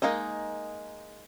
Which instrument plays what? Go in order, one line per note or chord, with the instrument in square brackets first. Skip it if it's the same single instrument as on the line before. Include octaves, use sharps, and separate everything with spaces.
[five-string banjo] G#3 A#3 D#4 D#5